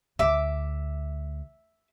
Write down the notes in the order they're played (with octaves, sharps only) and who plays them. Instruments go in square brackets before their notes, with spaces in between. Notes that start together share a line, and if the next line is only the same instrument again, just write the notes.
[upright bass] D2 [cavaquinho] E5 D6